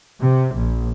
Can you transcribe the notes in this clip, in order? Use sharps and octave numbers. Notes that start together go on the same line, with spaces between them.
C3
A#1